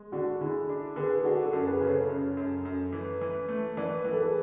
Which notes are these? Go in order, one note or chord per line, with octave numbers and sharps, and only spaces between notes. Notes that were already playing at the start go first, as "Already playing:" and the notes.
Already playing: G#3
D3 D4 F#4
D3 E4 G#4
D4
D3 G#4 B4
G#4
D4 F#4 A4
F#4 A4
F#2
G#4 B4
C#3
A4 C#5
F#2
F#2
F#2
E3
E3
A3
E3 B4 D5
E3 B4
A4
G#4 B4